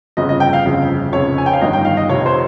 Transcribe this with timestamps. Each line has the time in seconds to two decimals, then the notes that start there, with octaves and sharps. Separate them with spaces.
0.17 G1 F2 C#3 D#5
0.29 D#5
0.40 G5
0.53 F5
0.65 G1 F2 C#3
1.13 F1 F2 C#3 C#5
1.38 G#5
1.46 G5
1.53 F5
1.61 G1 G2 D#3 D#5
1.73 G5
1.85 F5
1.97 D#5
2.09 F1 F2 C3 C#5
2.26 C5